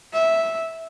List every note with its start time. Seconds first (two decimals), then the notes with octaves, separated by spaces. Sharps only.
0.13 E5